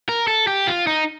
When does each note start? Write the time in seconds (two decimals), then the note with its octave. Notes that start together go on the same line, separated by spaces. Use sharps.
0.09 A#4
0.28 A4
0.47 G4
0.67 F4
0.87 D#4